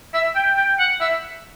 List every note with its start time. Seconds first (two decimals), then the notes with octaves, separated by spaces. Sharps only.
0.14 E5
0.35 G5
0.57 G5
0.79 F#5
1.00 E5